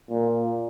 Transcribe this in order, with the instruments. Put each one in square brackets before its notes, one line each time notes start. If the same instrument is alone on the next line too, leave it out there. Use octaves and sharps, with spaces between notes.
[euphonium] A#2